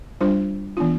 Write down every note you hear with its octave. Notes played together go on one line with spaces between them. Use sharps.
G3 D4 F4 C5
E3 B3 D4 F4